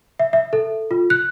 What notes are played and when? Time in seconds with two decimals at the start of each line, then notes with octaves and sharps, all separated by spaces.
0.19 E5
0.33 E5
0.53 A4
0.91 F4
1.10 F#6